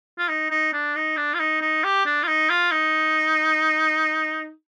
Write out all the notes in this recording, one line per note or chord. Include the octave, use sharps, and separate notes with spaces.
F4
D#4
D#4
D4
D#4
D4
F4
D#4
D#4
G4
D4
F4
D#4
F4
D#4